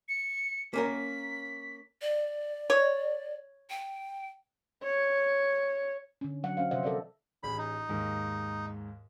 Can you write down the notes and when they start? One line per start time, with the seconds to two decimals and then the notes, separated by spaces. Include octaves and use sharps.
0.09 C#7
0.73 A#3 C#4 A#4 B6
2.02 D5
2.70 C#5
3.70 G5
4.83 C#5
6.21 D3 C#4
6.44 F#3 F#5
6.57 C#4 C5 F5
6.71 C3 F3 C5 D#5 E5 F#5
6.83 A4 A#4 D5 D#5
7.43 A1 G#4 B5
7.58 D#4
7.89 D#2 G#2 G#3